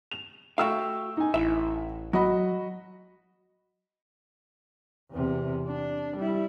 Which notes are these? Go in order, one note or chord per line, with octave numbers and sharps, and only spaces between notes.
F7
A3 F#4 E5 F5 G5 E6
D#4 G#5
A1 E4 E5
F#3 F#4 D#5 B5
E2 C3
D4
G3 E4